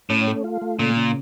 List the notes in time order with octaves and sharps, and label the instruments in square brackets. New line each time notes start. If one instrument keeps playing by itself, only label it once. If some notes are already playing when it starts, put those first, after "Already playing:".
[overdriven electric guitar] A2 [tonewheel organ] C#4
[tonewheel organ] A3
F4
A3
[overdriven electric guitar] A#2 [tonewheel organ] C#3
[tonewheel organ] C#3